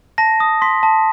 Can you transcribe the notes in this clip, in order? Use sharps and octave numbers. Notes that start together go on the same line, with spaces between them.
A5 A#6
D#6
C6 B6
A5